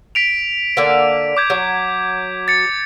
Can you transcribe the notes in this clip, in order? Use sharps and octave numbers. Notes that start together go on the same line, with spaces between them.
B6 D7 F7
D3 A#3 D5
D6 G6 G#6
F#3
A6 C#7